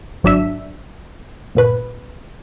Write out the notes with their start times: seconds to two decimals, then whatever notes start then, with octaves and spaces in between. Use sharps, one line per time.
0.23 G#1 F#3 D4 E5
1.55 G1 A#2 B4